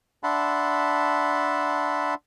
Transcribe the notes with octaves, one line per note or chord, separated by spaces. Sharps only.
D4 E5 F#5 A5 B5 C6